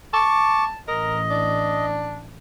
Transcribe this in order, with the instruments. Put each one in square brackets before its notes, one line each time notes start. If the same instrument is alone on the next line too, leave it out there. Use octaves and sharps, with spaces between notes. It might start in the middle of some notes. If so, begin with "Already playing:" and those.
[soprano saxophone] A5 [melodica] C#6 D6
[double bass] A1 [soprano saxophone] A#4 [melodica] D#5
[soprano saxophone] D4